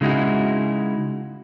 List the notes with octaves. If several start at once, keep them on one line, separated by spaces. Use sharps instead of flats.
C#3 G#3 D#4 E4 F#4